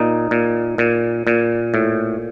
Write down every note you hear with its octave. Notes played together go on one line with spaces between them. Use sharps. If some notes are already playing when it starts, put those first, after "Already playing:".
Already playing: A#2 D#4
A#2
A#2
A#2
A2